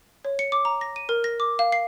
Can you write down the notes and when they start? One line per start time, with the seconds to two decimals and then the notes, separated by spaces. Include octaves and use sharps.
0.25 C#5
0.39 C#7
0.52 D6
0.65 A#5
0.81 A#6
0.96 D#7
1.09 A#4
1.24 A#6
1.40 D6
1.59 F5
1.72 C7